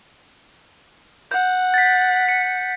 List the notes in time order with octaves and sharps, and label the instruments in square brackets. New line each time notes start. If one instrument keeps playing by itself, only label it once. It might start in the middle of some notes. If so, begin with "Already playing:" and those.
[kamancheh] F#5 [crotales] G6
[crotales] A6 B6
C#7